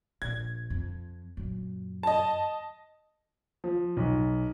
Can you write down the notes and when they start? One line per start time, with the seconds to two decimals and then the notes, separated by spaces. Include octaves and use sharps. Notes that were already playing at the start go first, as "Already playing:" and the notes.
0.22 A#1 G#6
0.70 F2
1.37 F#2 A#2
2.03 D#5 A5
3.64 F3
3.97 B1